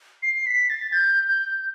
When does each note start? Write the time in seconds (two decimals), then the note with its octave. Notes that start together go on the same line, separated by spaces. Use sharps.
0.23 C7
0.47 B6
0.70 A6
0.93 G6
1.28 G6